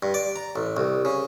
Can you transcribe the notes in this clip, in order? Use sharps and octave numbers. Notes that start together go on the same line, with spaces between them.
G2
D5
A#5
A1
C2
C#3